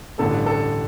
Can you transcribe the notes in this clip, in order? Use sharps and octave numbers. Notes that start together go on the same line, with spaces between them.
A1 G2 D3 A3 A4
A4